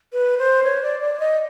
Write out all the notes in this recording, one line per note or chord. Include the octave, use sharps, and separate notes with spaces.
B4
C5
C#5
D5
D5
D#5